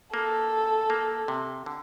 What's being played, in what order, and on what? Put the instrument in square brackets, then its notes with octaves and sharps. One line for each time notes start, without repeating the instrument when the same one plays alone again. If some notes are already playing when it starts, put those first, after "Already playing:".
[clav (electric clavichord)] A#3 [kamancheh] A4
[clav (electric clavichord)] A#3
C3
D3